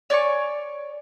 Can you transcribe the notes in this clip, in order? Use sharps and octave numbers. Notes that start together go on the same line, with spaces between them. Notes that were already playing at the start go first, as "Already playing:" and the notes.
C#5 D5 G#5 C#6